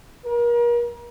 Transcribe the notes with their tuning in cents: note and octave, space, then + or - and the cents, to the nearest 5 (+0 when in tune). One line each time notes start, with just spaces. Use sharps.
A#4 +35